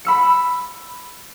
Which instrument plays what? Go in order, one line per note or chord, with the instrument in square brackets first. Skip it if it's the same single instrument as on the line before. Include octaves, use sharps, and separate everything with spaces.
[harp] B5 E6 C#7